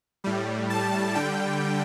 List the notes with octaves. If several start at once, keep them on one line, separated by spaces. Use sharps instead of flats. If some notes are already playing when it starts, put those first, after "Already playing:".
A2 G3
A5
D3 G3 G5